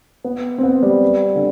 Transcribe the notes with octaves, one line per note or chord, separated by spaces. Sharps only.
B3
C4
B3
G3
D3